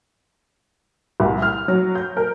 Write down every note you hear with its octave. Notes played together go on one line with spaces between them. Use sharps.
C2
F6
F#3
G6
A#4